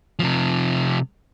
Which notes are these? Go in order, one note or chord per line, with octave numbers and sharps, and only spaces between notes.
C3 F3